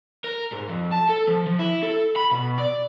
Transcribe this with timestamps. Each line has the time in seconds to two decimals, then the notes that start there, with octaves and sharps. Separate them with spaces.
0.24 A#4
0.52 G#2
0.69 F2
0.92 A5
1.10 A4
1.28 F3
1.47 F3
1.59 E4
1.83 A4
2.16 B5
2.31 B2
2.58 D5